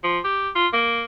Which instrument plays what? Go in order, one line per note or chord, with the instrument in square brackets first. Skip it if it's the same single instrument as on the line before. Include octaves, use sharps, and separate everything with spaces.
[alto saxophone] F3
G4
F4
A#3